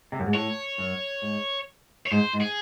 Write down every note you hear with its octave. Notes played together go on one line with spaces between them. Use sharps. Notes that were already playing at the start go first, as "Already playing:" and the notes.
C3
F#2
G#2
A2 C#5
F#2
G#2
C#5
G#2 C5
G#2
G#4